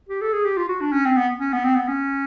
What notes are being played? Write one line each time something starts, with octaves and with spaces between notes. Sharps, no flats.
G4
A4
G#4
G4
F4
F#4
D4
C#4
C4
B3
C#4
B3
C4
B3
C#4